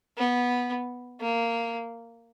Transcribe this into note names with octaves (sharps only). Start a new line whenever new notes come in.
B3
A#3